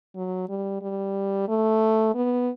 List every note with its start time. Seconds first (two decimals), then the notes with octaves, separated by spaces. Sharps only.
0.16 F#3
0.49 G3
0.82 G3
1.48 A3
2.15 B3